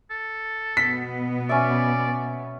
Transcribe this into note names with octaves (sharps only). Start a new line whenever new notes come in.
A4
B2 B3 B6
C#4 D5 E5